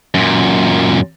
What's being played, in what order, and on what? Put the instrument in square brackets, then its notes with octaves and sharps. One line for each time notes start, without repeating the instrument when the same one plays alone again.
[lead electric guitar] F#2 A#2